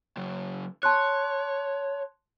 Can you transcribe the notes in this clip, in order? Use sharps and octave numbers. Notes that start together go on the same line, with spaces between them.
C#3 F#3
C#5 A5 C6 F#6